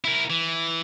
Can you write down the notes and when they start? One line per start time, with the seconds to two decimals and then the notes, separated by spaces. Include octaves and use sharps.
0.04 E4 A#4
0.30 E3